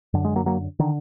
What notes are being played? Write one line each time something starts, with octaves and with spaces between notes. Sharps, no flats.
F#2 D3
G#3
F#3 A#3
F#3 A#3
D3 D#3